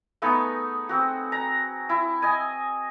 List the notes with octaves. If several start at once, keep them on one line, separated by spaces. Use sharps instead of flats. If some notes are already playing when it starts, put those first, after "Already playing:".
A3 B3 D#4 G#4
C4 F#4
A#5
E4
D#5 G#5